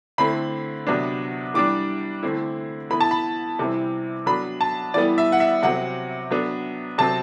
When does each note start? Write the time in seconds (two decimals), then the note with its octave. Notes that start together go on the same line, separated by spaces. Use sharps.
0.18 D3 A3 C4 E4 B5
0.87 C3 F#3 B3 D4
1.54 E3 G3 D4 D6
2.23 D3 A3 C4 E4
2.90 E3 B3 E4 B5
3.01 A5
3.11 B5
3.59 C3 E3 G3 C4 E4
4.26 F#3 B3 D4 B5
4.61 A5
4.94 E3 G3 B3 E4 D5
5.18 E5
5.32 F#5
5.40 E5
5.63 C3 F#3 C4 F#5
6.31 F#3 B3 D4
6.98 C3 F#3 C4 A5